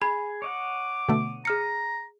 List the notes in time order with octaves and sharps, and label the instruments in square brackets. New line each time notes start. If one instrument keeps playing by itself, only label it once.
[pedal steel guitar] G#4 [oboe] G#5 [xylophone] B5
[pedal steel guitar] C#5 D#5 F#5 [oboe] D6
[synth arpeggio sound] B2 D3 A3
[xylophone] G#4 F6 C#7 [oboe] A#5